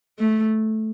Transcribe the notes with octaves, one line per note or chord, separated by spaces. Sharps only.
A3